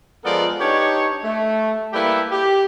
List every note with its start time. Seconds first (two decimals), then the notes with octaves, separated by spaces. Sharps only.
0.24 F3 G#3 B3 A4 A#4 D5
0.59 D4 D#4 G4 B4 C#5
1.24 A3
1.93 G3 A#3 E4 G4 A4 B4
2.32 G4